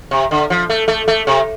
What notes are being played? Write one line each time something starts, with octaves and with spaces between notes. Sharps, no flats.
C3
D3
F3
A3
A3
A3
C3